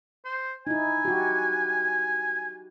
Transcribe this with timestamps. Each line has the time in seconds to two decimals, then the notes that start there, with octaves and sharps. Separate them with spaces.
0.25 C5
0.67 D#4 E4 G#5
1.05 F#4 G4